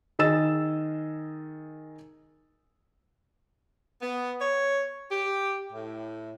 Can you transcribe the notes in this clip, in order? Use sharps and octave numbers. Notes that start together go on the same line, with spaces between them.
D#3 G#4 D#5 E6 A6 E7
B3
C#5
G4
A2